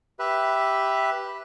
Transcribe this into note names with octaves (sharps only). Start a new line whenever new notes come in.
G4 B4 E5